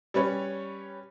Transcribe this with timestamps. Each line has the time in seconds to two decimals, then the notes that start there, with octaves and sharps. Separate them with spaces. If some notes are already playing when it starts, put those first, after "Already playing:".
0.14 G3 C#4 B4 C#5